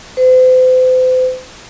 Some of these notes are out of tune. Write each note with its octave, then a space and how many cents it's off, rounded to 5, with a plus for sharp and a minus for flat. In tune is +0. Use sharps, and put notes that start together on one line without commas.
C5 -40